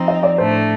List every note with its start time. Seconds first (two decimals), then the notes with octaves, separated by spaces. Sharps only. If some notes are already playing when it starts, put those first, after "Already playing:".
Already playing: F3 C4 D#4
0.08 D#5
0.23 D5
0.38 A2 A3 D4 C5